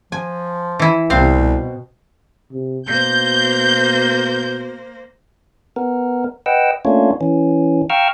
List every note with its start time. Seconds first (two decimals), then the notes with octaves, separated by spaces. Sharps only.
0.12 F3 G#5
0.79 E3 E4
1.10 C2 C3 B3 C4 F5
1.40 B2
2.52 C3
2.89 B2 A#3 C5 G6
5.76 B3 A#4
6.46 B4 D#5 F#5 G5 E6
6.85 A3 A#3 C#4 D4 F4 C#5
7.21 E3 C#4
7.90 F5 G5 A#5 C#6 E6 F6